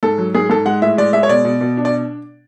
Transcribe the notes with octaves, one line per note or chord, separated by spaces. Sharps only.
G#2 A4
F#3
G#2 G#4
G#2 A4
G#3 F#5
A2 E5
G#3 D5
G#3 E5
C#5
B2 D5
B2
B2
D4
D5